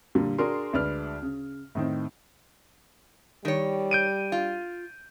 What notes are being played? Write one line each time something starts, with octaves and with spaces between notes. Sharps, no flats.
A#2 D3 G3
D4 F#4 G#4 A#4 C6
D2 G#3 D4 B4 F6
C#3
A2 D#3 C4
D#3 G3 C#5
G6 D7 D#7
F4